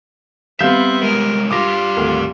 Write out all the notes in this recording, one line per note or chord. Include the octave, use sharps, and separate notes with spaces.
G3 B3 C4 E5 F5 G6
C2 G#3 A#4
G2 F4 G4 D6 A#6
G#1 D2 A#4